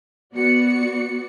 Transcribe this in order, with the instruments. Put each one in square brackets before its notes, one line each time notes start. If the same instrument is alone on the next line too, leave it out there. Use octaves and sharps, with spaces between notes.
[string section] B3 F#4 D5 C#7